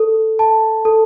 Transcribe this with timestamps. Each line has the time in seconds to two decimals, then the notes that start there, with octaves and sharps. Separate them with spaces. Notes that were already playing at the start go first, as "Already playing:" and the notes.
Already playing: A4
0.39 A5
0.85 A4